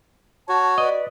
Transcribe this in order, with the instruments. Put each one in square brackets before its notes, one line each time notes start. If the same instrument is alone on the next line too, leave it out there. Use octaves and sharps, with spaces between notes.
[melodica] F#4 [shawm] C#5 [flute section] A5
[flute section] B4 D5 [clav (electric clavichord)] D#5